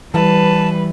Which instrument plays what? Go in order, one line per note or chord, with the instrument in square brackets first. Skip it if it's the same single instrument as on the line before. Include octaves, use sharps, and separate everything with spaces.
[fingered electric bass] E3 [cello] G3 [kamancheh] B4 [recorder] A5